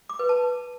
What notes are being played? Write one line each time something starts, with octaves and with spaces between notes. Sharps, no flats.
D6
B4
A5